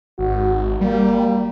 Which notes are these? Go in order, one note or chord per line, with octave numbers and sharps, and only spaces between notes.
G#1 F#4
G3 A#3